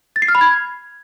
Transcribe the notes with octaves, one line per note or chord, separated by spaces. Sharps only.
A6
C7
F6
B5
G#6